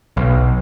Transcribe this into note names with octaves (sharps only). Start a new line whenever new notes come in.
B1